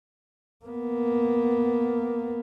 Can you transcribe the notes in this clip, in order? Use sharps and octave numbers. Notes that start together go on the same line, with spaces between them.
A#3 B3